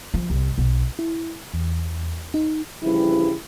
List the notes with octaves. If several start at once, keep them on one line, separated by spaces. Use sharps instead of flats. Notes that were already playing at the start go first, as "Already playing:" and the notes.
F3
C2
B1
E4
E2
D#4
G2 C#3 E3 F3 G3 E4